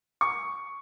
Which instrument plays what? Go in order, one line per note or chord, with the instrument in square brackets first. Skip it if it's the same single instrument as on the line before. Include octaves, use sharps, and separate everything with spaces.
[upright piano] C#6